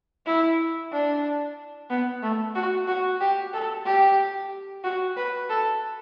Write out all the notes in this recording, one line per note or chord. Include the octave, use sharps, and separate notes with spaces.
E4
D4
B3
A3
F#4
F#4
G4
A4
G4
F#4
B4
A4